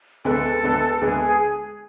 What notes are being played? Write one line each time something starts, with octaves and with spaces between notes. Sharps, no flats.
D2 D3 G#3 B3 A4
D2 D3 G#3 B3
D2 D3 G#3 B3 G#4